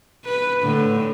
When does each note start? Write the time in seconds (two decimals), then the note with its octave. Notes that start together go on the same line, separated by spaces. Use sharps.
0.25 B4
0.63 A2 D3